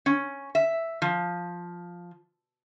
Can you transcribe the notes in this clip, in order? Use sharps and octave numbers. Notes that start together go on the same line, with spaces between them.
C#4
E5
F3